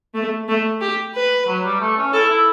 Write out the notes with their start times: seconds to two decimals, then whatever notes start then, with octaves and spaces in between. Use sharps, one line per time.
0.14 A3
0.49 A3
0.81 G4
1.15 B4
1.47 F#3
1.64 G3
1.81 A3
1.97 C#4
2.13 E4 A4
2.30 E4